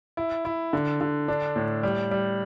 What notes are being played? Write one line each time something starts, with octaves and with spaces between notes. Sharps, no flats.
E4
E4
D3
D3
D4
A2
G3
G3